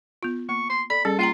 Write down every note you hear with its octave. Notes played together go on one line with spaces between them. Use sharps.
B3 F4
A#3 C#6
C6
A4 D5 B5
G3 C#4 G#4 A4
A#3 F4 G5 A#5